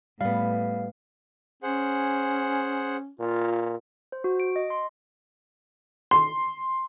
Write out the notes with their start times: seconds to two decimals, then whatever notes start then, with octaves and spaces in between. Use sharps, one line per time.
0.21 A2 G3 B3 F5
1.63 C#4 G#4 C5 F#5
3.20 A#2 F4
4.12 C5
4.24 F#4
4.40 D7
4.56 D#5
4.70 C6
6.11 C6